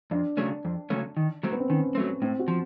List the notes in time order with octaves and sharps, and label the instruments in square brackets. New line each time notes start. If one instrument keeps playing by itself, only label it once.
[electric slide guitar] F2 [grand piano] D4
[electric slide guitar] C#3 F#3 A3 C#4
F2
C#3 F#3 A3 C#4
D#3
F#3 A3 C4
[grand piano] B3
C4
[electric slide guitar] D#3 [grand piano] C#4
[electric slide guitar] F#3 A3 C4
[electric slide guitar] A2 [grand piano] C4
[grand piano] F#4
[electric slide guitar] F3